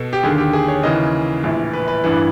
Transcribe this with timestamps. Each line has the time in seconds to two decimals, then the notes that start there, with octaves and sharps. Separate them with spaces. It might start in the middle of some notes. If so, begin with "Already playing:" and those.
Already playing: B2 A4
0.13 G4
0.23 D#2 D3 G#4
0.38 G4
0.53 G#4
0.68 C#5
0.83 D#2 C#3 E3 D#5
1.43 A#1 A2 E3
1.73 B4
1.88 B4
2.04 A1 G2 E3 B4